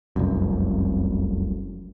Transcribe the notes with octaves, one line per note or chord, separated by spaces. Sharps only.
F1 C2 F#2